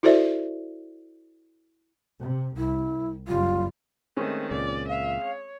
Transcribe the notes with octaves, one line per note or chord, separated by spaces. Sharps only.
E4 F#4 A4 C5 D5 E5
C3
C2 E4
F#1 G3 F4
D#3 G#3 A3 C4 C#4
C#2 A#2 D5
E5 F5
C#5